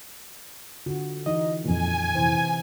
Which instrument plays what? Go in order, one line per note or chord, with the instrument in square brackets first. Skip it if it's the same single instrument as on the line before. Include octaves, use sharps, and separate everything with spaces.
[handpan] D3 F4 F#4
[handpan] E3 D#4 [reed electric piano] D#5
[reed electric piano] F2 A#2 [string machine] G#5
[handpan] C3 E3 C5